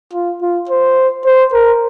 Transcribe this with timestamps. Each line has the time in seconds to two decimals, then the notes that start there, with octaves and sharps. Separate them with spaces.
0.13 F4
0.41 F4
0.69 C5
1.26 C5
1.53 A#4